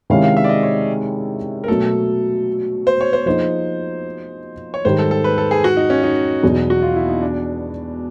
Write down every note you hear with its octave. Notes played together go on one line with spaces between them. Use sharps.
C3 D#3 G#3 C#4 E4 F5
F5
E5
D5
D#5
C#5
A#4
B2 F#3 A3 A4
C5
C#5
C5
F3 A#3 D#4 G#4 C5
C#5
G#2 D#3 G3 C5
A4
A4
B4
A4
G#4
F#4
D#4
C#4
D#4
E2 B2 F#3
F#4
F4
E4
D#4
D4